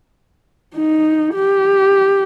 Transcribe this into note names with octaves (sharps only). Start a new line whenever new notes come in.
D#4
G4